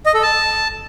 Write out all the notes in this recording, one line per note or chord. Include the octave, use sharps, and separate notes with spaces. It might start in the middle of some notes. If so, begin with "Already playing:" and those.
D#5
A4
A5